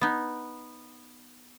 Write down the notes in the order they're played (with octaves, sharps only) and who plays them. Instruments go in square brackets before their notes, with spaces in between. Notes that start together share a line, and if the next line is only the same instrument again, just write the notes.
[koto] B3 D#4